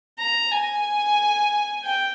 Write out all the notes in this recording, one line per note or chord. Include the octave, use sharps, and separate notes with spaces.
A#5
G#5
G5